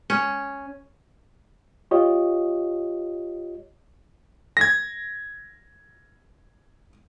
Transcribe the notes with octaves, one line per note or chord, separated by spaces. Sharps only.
C#4
F4 G4 C#5 D#5
G#6 A#6